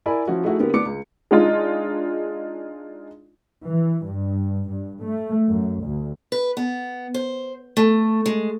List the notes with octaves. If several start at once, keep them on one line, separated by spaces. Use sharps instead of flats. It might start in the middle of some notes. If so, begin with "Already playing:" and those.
E4 A#4 D5 G#5 B5
F3 C#4 E4 F#4
A3 D#4 E4 F#4 G#4 E5
D3 A#3 B3 G4 A#4
B3 D4 D6 C#7
C#2
G#3 D4 D#4 F4
E3
G2
G2
A3
F#2
D2
B4
B3
C5
A3
G#3